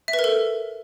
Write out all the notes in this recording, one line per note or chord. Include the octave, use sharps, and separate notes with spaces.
E5
B4
A#4
A4